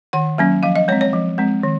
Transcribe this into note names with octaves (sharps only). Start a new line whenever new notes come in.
D#3 F#5
F#3 A#3 C#4
F3 F5
D#5
G#3 C4 C#5
C#5
F3
G#3 C4
D#3